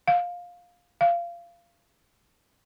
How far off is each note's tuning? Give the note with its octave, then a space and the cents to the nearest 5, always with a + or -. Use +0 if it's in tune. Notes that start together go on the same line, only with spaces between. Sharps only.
F5 +15
F5 -20